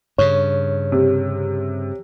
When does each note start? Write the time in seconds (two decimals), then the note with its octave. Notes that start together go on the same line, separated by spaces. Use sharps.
0.18 G2 C#3 C#5
0.92 C3